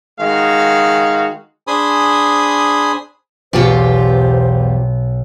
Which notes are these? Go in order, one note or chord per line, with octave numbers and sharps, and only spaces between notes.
D#3 G#3 F#4 F5
D4 G#4 C5 G#5 B5 D#6
B1 E2 F4 G4 C5